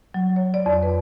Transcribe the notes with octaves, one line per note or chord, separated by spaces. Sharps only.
F#3
C#5
D5
F2
B4